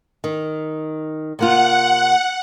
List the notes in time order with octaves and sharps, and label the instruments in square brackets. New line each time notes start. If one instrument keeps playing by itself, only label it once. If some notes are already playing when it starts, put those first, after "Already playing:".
[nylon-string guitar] D#3
[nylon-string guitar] C3 A#3 F4 [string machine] F#5